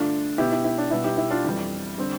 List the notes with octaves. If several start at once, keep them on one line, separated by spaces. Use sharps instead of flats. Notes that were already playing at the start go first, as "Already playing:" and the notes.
Already playing: G2 D3 A3 D4 F4
B2 B3 E4 G4
E4
E4
D4
B2 G3 B3 E4
E4 G4
E4
D4 F4
F2 E3 G3
D3 G3 C4